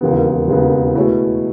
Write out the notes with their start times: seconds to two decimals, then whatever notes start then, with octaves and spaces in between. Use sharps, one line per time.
0.01 E1 D#2 C#3 E3 B3
0.48 E1 D#2 C#3 E3 B3
0.95 B2 A3 E4 G#4 C#5